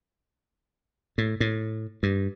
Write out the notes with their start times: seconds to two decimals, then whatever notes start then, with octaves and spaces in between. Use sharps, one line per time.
1.18 A2
1.40 A2
2.03 G2